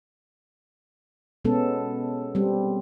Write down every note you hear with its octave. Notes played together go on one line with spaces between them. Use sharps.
B2 G#3 B3 C#4 A4
G3 C4